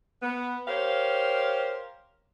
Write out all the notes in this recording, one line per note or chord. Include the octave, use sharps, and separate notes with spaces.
B3
G4 A#4 C5 C#5 F5